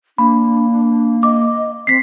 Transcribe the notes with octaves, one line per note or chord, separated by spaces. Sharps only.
A#3 D4 B5
D#5 D6
C4 B6 C7